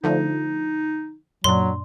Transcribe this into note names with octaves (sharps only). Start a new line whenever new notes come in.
D3 F3 A3 D#4
F#2 A#2 F#3 D4 C6